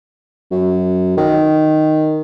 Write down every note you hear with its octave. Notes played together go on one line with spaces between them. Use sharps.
F#2
D#3